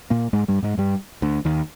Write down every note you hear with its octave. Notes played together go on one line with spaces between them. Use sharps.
A#2 A#3
G#2 G#3
G2 G3
G#2 G#3
G2 G3
D2 D3
D#2 D#3